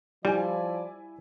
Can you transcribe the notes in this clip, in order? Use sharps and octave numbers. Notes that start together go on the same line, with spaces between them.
F3 G3 E4 D5 G#5